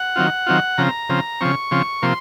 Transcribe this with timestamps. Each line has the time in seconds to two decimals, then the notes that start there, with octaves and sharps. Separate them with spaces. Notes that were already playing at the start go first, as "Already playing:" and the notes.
Already playing: F#5
0.16 D#3 F#3 C4 F4
0.47 D#3 F#3 C4 F4
0.78 C#3 F3 C4 A#5
1.09 C#3 F3 C4
1.41 C#3 F3 C4 C#6
1.71 C#3 F3 C4
2.02 C3 F3 A#3 C6